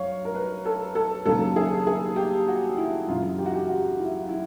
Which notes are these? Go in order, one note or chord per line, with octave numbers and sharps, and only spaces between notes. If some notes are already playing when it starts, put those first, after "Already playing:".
Already playing: F#2 F#3 C#5 F5
A#4
B4
A4
A4
D#2 C#3 F#3 A4
G#4
G#4
G4
F#4
E4
F#2 C#3 E3 F4
G4
F#4
G4
F#4
E4
E4